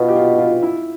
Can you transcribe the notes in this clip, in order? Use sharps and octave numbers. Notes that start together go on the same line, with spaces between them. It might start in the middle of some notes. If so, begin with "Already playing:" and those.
Already playing: B2 F4
G4
F4
F4
E4